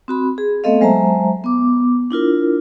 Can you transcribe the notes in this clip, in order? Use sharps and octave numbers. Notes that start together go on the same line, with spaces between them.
C4 F#4 B5
G#4
A3 B3 C4 A4 D#5 F5
F#3 G#3 C5 E5 A5 A#5
B3 D6
D4 E4 F4 A#4